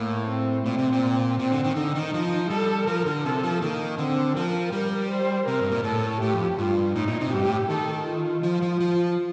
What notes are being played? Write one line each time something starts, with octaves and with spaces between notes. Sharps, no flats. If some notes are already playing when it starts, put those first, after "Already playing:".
Already playing: A2 A#3
C4
A#2 C4
C3
A#2
A#2 C4
D3
D#3
D3 D#4
D#3
F3
G3 A4
F3 A#4
D3
C3 A4
F3
D#3 A#3
D3 C4
F3 A#4
G3
C5
C3 A#4
G2
A#2
A2 A4
A2 G4
F2
G2 F4
A2 D#4
A#2
C3
G2 G4
A2
D#3 A4
F4
F3
F3
F3